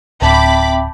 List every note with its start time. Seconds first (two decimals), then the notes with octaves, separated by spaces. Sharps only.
0.22 D1 C4 E5 G5 A5 B5 D6 G6